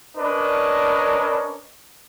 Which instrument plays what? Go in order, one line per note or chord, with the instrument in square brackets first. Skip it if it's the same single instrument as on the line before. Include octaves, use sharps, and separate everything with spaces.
[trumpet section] C#4 D4 A#4 B4 D#5